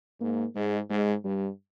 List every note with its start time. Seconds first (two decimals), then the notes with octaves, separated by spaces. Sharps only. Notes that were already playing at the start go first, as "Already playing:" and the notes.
0.20 G#2 A#3
0.55 G#2 G#3
0.90 G#2 G#3
1.24 G2 G3